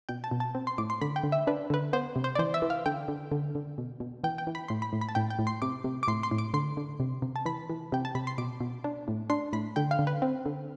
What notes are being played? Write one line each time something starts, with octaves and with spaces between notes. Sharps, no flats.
B2 G5
A5
B2
A5
C4
C6
A2 D6
C6
D3 B5
G5
D3
E5
D4 B4
D3 B4
B3 C5
C3
C5
D5
E3 C5
E5
E3
F5
D3 G5
D3
D3
D3
B2
B2
E3 G5
G5
E3
B5
A2 C6
B5
A2
B5
A5
A2 G5
G5
A2
C6
C3 D6
C3
D6
A2 C6
C6
A2
D6
D3 C6
D3
C3
C3
A5
E3 B5
E3
C3 G5
A5
C3 B5
C6
B2 D6
B2
D4
A2
D4 C6
A2 B5
D3 G5
F5
D3
B4
C4
D3